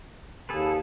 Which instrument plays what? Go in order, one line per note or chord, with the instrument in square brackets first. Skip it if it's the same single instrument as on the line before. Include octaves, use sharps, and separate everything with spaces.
[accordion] D#2 [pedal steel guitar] G#4 A4 B4